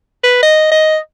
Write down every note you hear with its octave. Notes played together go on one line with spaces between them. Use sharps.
B4
D#5
D#5